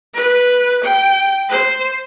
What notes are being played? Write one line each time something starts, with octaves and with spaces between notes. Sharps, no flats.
B4
G5
C5